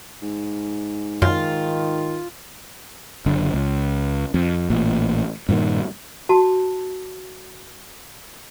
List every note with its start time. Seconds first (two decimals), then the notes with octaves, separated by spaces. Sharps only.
0.22 G#2
1.22 F#2 D#3 F4
3.26 F#1 D3
3.54 C#2
4.34 F2
4.70 A1 A#2
5.49 G2 A#2 D3 D#3
6.29 F#4 A5